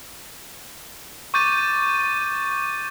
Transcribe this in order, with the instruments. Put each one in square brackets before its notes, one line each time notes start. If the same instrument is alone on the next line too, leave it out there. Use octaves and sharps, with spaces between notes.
[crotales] C#6 D6 G6 A6 D#7